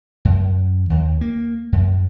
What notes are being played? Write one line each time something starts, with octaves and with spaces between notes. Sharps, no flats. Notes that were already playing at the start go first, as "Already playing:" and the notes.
F#2
D#2
A#3
F#2